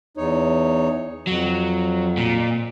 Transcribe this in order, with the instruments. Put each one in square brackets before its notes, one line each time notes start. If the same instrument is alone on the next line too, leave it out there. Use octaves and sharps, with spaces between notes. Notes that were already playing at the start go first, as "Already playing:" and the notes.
[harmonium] E2 D#4 C#5
[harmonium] F2 [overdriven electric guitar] F#3
[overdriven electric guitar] A#2